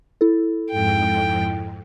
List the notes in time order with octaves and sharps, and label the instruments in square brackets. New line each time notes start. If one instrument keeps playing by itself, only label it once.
[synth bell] E4 A4
[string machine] F2 G#2 [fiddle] G5